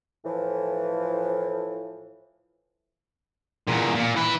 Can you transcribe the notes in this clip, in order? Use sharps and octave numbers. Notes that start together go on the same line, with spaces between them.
A2 E3 F3
E2 A#2
A#2
E3 B4